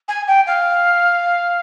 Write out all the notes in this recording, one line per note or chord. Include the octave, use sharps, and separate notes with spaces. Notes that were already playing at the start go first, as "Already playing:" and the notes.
G#5
G5
F5